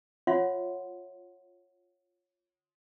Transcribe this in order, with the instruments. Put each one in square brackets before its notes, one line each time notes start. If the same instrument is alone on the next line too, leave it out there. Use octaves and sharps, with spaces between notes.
[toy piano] F4 C#5 E5 F#5 C6